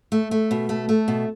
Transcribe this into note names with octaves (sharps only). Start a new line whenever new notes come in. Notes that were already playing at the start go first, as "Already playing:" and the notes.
A3
A3
B2
A3
A3
B2